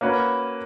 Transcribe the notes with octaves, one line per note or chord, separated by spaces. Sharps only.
A#3 C#4 F#4 B4